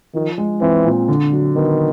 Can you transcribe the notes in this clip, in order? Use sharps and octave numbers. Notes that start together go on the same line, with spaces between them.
D#3 F3
G#3
E3 C4
A#2
D3
F#3
D#3 B3